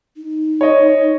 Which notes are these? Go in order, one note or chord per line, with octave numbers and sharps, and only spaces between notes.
D#4
C#5 D#5